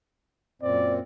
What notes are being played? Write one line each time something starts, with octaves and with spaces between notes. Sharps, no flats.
F#2 A#2 C4 D5